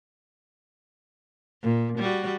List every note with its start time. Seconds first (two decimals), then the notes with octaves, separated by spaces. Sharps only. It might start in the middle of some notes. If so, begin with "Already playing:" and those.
1.62 A#2
1.98 G3 F#4